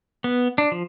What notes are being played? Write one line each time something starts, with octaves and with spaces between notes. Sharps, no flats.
B3
D4
F3